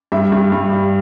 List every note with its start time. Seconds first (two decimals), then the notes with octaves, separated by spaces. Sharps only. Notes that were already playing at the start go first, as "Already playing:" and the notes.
0.12 G2 E5
0.32 G2
0.52 G2
0.73 G3